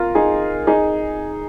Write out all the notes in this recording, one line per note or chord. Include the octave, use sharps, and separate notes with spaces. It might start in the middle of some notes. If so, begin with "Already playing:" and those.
Already playing: F4 A#4
D#4 G#4
D#4 G#4